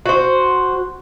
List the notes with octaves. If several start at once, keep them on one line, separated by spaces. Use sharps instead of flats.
F#4 C5